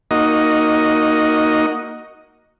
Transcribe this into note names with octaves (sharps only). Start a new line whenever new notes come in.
A#3 D#4 F#4 D#5